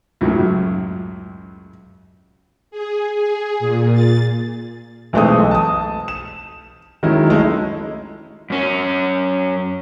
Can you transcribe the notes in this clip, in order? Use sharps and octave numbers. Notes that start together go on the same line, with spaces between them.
C#2 F#2 A2 F#3
G#4
G#4
A#2
A6
B1 E3 G#3 A3 C4 D#6
A5 D#6
E7
D#3 F#3 G#3 C#4 E4
G#3 A3 D#4 E4
F#2 C#4